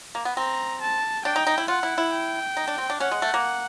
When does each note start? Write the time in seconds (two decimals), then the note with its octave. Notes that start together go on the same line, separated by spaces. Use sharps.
0.15 A#3
0.25 B3
0.36 C4 A#5
0.81 A5
1.25 D4 G5
1.36 D#4
1.47 D#4
1.58 E4
1.68 F4 F#5
1.83 E4
1.98 E4
2.13 G5
2.57 D#4
2.68 D4
2.78 C4
2.90 D4
3.00 C#4 F#5
3.11 G#3
3.22 A3
3.34 A#3